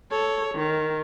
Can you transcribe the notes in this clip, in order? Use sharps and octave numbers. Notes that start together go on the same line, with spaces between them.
A4 C#5
D#3